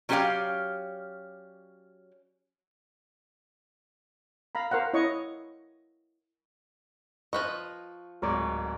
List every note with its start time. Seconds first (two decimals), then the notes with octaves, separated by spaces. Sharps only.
0.09 F#3 C#4 G4 C5 D5 F5
4.55 F5 A#5 B5
4.71 A#4 C5 F5 F#5
4.94 E4 C#5 D#5 C#6
7.33 F3 B4 D#5 C#6
8.22 D1 G#2 A#4 C#5 D5